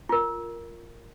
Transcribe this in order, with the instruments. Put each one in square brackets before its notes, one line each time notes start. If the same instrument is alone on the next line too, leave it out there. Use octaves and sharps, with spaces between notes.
[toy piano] F4 A#4